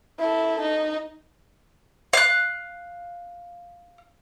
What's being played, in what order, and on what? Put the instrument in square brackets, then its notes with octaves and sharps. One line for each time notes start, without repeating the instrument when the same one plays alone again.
[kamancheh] E4 A4
D#4
[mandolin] F5 F#6